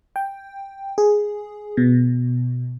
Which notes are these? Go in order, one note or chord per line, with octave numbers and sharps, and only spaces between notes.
G5
G#4
B2